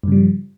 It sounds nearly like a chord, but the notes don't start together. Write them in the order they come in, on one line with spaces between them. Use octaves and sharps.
G2 C#3 G3 F3